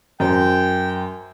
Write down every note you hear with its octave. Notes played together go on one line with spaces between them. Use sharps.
F#2 C5 G5